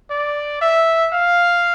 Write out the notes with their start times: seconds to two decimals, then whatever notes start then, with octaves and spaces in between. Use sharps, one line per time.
0.10 D5
0.61 E5
1.13 F5